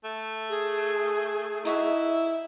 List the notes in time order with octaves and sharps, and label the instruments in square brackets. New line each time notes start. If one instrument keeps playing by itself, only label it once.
[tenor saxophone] A3
[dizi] G#4
[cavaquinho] D#4 F#4 E5 [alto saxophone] E4